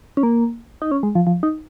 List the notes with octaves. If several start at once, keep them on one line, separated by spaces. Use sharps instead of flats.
C#4
A#3
D#4
C#4
G#3
F3
F3
D#4